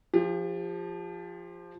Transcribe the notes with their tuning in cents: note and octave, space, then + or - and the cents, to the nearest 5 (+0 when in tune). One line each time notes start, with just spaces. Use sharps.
F3 +0 G4 +40